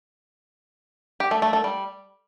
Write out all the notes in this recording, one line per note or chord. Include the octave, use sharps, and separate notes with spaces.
G4
A3
A3
A3
G3